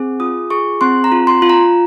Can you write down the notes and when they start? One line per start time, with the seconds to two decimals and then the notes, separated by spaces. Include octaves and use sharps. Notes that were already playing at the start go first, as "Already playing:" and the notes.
Already playing: C4 G#4
0.20 F4 D#6
0.50 G#4 C#6
0.81 C4 C6
1.04 A#5
1.12 F4
1.27 C6
1.42 F4
1.50 A#5